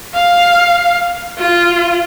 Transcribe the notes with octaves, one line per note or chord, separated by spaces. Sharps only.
F5
F4